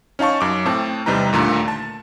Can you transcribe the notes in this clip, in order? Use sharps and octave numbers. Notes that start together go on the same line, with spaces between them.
C#4 D#4 F5 A5 C#6
F#2 D6
A2 C4 A5
E2 C3 G3 D#4 B4 A#5
D#2 A#2 D3 A3 A#5
A5